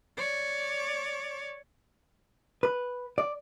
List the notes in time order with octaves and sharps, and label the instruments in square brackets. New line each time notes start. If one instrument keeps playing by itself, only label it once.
[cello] C#5 D5
[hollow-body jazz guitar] B4
D5